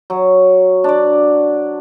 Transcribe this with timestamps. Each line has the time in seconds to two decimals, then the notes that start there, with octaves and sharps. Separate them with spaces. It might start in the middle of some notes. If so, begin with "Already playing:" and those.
0.10 F#3
0.84 D4 D5